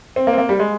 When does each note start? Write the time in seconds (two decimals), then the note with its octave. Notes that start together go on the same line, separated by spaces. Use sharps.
0.16 C4
0.27 A#3
0.33 C4
0.38 A#3
0.49 G3
0.59 G#3